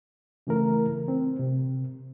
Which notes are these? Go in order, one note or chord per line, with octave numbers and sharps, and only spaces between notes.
C#3 E3 A3 A#4
C4
C3